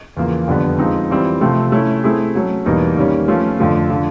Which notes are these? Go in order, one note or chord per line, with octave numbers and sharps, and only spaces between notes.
E2 C#3 F3 A#3
F2 D3 G3 B3
F3 G#3 C4 D#4
E3 G3 C4 F4
C3 F3 A3 C4
A3 C#4 E4
A3 C4 E4 G#4
F#3 A3 C#4
E2 B2 G3 A#3 D#4
D#3 G3 A#3 C#4
F3 A3 C#4 F4
F2 D3 F3 A3
D3 F3